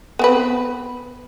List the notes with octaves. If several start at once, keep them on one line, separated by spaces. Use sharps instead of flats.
B3 C4 B4